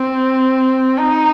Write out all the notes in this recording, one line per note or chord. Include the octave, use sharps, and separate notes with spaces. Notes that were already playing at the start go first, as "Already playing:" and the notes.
Already playing: C4
D#4